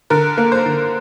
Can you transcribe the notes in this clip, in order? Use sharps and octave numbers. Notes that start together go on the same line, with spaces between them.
D3 A#4
A#3
C5
D3